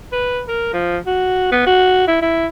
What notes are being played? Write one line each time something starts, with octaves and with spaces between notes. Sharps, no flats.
B4
A#4
F3
F#4
B3
F#4
E4
E4